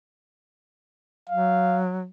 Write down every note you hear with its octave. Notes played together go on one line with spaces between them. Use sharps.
F#3 F5